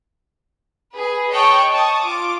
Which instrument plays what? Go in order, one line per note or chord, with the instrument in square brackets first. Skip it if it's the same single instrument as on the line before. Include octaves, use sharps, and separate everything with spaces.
[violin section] G#4 B4
C#5 D#5 G5 A5 C#6 F#6
A5 C#6 D#6
F4 D6